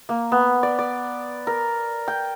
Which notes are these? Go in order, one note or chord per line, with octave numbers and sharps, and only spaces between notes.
A#3
B3
D5
D5
A#4
G5